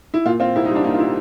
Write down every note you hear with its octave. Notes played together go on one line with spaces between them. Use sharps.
E4
A#2 F4
C4 F4
C2 E4
D#4
G3
D4
A#2 D#4
F4
C4 E4